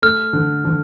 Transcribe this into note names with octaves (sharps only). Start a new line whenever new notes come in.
A3 F6
D3
D3